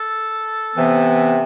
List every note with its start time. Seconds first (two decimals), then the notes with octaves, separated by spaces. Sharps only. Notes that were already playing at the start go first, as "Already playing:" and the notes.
Already playing: A4
0.76 C3 E3 B3